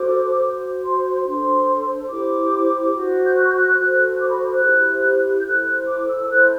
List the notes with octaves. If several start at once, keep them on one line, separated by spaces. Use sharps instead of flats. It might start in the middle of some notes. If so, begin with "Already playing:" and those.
Already playing: F#4 A4 C5 D6
F#4 C5
C6
C6
D4 A4 C5 C6
E4 G4 C5 D6
F#4 C5
G6
F#6
G6
F#6
F#4 A4 C5
D6
B5
D6
F#6
E4 G4 C5
G6
E4 A4 C5 F#6
D6
E6
E4 A4 C5 F#6